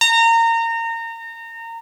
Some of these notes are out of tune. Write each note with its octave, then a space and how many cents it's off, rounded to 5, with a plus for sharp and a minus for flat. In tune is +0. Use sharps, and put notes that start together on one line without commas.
A#5 -25